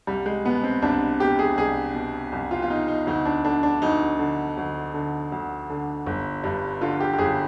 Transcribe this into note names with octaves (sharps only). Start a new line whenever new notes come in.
C2 G3
G#3
B2 B3
C4
C2 D4
B2 G4
G#4
C2 G#4
B2
C2
F4
F4
B2 D#4
D#4
D2 D#4
D4
D3 D4
D4
D2 D#4
D3
D2
D3
D2
D3
G1
G2
D3 F4
G4
G4
G1 G#4